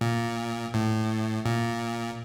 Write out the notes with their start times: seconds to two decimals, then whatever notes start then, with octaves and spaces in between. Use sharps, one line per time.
0.01 A#2
0.74 A2
1.46 A#2